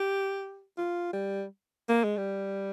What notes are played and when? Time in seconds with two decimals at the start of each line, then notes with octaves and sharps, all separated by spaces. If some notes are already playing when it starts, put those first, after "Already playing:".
Already playing: G4
0.78 F4
1.13 G3
1.89 A#3
2.04 G#3
2.17 G3